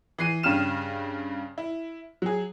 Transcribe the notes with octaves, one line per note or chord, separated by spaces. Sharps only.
E3 C7 D#7
G2 C#3 G4 F6 E7
E4
F#3 G#4